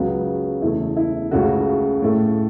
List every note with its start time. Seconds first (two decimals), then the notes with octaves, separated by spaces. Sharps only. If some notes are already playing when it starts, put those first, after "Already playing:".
Already playing: C#2 C#3 F#3 B3
0.61 E2 C#3 A3 E4
0.96 E4
1.31 C#2 C#3 A3 F#4
2.02 A2 A3